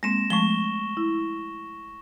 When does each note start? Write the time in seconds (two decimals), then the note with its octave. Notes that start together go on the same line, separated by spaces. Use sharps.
0.03 G#3 A#3 C4 A#6 E7
0.30 F3 G#3 A3 C#6 G7
0.97 E4